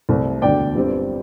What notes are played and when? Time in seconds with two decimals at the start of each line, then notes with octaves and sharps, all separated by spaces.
0.09 C2 C3 A3 C4
0.42 E1 D2 D3 D5 G5
0.75 G1 G2 G3 C4